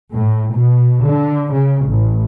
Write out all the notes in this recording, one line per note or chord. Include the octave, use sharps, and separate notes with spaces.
A2
B2
D3
C#3
A1